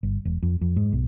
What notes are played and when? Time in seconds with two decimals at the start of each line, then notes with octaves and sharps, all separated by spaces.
0.03 G1
0.25 E1
0.43 F2
0.61 F2
0.76 G#2
0.93 B1